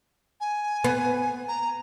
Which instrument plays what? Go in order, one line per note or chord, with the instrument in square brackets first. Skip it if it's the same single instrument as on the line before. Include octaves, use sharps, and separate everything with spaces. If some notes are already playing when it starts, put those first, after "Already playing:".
[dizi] G#5
[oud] B3
[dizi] A#5